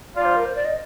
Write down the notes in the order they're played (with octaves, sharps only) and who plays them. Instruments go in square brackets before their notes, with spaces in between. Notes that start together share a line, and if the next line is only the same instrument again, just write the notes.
[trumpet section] G3 D4 F4 [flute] D5
[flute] C5
A#4
C5
D5
D#5